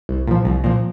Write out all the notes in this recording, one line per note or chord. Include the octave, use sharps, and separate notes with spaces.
C2
A#2 F3
C2
A#2 F3